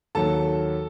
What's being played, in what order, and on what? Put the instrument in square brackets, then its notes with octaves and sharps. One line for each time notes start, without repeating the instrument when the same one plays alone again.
[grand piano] D#2 D#3 F#3 A4 A5